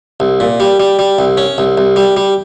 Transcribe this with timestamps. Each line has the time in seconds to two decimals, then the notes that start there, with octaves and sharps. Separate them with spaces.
0.20 C2
0.40 A#2
0.60 G3
0.80 G3
0.99 G3
1.19 C2
1.37 C#4
1.58 C2
1.78 C2
1.96 G3
2.17 G3